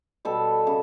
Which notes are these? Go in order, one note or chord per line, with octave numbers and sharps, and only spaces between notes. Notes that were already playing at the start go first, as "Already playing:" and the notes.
B2 G3 A4
C#3